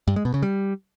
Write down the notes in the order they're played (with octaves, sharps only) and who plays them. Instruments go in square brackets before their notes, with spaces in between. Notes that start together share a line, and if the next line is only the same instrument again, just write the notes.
[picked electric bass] G2
G#3
B2
C#3
G3